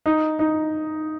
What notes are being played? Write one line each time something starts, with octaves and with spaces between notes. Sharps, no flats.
D#4
D#4